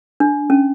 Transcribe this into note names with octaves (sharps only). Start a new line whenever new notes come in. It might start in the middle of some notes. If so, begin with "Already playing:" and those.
D4
C#4